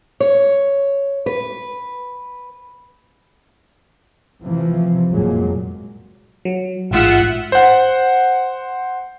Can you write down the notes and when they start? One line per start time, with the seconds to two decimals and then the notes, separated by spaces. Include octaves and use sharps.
0.20 C#5
1.26 B4
4.42 A2 C3 E3 F3
5.11 G1 F2 A#2 F#3 G#3
6.45 F#3
6.91 A1 G#2 F4 E5 F#5
7.52 C5 F#5